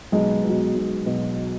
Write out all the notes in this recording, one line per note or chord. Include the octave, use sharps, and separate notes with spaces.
B1 G#3
B2 F#3
B1
B2 F#3